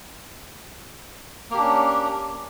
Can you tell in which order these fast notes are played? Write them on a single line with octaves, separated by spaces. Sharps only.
A#3 G4 D4 C#4